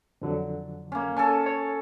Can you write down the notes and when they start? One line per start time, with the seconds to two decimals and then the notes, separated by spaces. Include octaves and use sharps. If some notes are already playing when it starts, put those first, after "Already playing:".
0.21 F2 D3 F#3
0.92 A#3 C#4
1.17 C#4 A4 G#5 A5
1.46 C#5